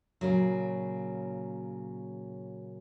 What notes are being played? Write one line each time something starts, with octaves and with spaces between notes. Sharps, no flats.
A#2 C#3 F#3